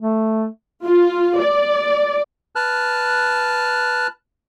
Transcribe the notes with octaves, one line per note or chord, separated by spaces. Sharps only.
A3
F4
D5
B4 A5 F6 F#6